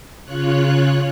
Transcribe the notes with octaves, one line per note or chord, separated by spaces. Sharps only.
C#3 F4 C#5 F#6